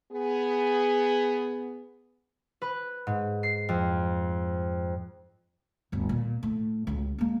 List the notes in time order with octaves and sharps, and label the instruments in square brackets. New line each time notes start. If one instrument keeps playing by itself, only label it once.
[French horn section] B3 G#4
[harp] B4
G#2
C7
F2
[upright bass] D1 G1
A#2
A2
C#2 F#3
G#3 A#3